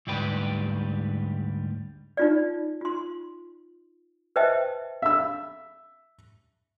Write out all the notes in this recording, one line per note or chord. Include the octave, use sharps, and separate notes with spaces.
D2 G#2 G3 G4 B4
D#4 F4 D5
F4 C6
B4 C5 D#5 E5 G5 A5
E5 E6